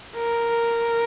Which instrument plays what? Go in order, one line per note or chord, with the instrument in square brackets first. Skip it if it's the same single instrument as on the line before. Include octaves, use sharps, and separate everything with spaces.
[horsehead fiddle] A#4